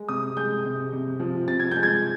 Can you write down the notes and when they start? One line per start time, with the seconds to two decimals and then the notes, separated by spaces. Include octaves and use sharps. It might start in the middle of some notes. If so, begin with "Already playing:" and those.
Already playing: G#3
0.09 C3 D#6
0.37 G#3 G6
0.65 C3
0.93 C3
1.20 F3
1.48 C3 A6
1.60 G#6
1.71 G#3 G6
1.83 G#6